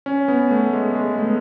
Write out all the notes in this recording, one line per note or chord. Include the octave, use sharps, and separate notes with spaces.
C#4
B3
A3
G#3
G#3
A3
B3